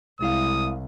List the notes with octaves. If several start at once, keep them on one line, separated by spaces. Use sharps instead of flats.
C2 G#3 E4 F5 D#6